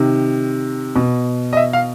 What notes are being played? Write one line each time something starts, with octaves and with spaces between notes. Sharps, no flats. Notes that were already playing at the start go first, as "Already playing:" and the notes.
Already playing: C3 D#3
B2
D#5
E5
F5